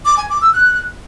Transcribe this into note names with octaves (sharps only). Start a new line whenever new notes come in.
D6
G#5
D6
E6
F#6